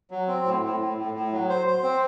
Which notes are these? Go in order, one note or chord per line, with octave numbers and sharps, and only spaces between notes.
F#3
C4
A2
A2
A2
A2
A2
F#3
C5
C5
C4